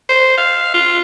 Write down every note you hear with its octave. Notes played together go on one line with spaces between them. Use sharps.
C5
F5
F4